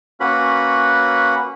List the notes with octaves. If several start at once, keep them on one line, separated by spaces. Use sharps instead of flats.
A#3 C#4 F#4 B4 B5